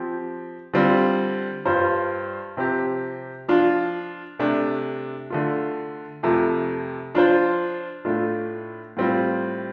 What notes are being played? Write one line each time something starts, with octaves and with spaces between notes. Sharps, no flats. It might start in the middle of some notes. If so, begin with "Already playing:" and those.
Already playing: F3 C4 G4
D3 G3 C4 F4
G2 G3 F4 C5
C3 F3 C4 G4
F3 D4 F4
C3 A3 D4
D3 A3 F4
F2 C3 F3 A3
F3 D4 F4 C5
A2 A3 D4 F4
A2 G3 C4 F4